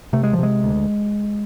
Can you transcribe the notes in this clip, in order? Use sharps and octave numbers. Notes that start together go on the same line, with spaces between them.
C3 A3
G#3
F3
C3 G#3
D2